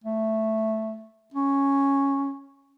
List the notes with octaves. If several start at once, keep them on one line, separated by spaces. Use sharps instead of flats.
A3
C#4